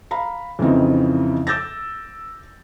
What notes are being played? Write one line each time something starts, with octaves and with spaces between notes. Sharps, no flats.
F5 A#5 B5
F2 C#3 E3 C4 D#4
D6 E6 G6 A6 A#6